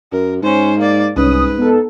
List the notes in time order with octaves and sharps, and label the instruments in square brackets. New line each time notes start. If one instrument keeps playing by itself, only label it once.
[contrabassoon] F#2 [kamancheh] A#4
[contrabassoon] G#2 [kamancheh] C#4 C5
[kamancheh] A#3 D5
[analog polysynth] C2 C#4 D#6 [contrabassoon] G#2 [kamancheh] B4
[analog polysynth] B3 D#4 A4